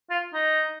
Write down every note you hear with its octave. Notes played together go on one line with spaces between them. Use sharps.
F4
D#4